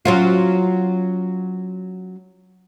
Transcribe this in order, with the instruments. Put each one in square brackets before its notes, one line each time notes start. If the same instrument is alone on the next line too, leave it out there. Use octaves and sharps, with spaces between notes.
[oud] F#3 C#4 F4